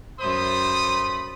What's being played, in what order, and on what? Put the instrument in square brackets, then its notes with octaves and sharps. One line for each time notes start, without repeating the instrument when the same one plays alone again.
[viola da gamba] F#2 C5 [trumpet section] A3 B5 D#6 [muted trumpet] C6